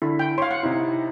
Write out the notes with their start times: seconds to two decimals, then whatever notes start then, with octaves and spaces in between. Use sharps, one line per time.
0.02 D3 E4
0.19 G5
0.38 C#5 F5 C6
0.51 F#5
0.63 C3 D#4 E4